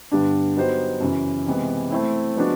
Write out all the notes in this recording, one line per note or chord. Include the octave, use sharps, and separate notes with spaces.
G2 D3 G3 B3 D4
F#3 B3 D#4 G4 C5
F#2 C#3 E3
C3 E3 G#3 B3
A3 C4 E4
F3 G#3 B3 D4 F#4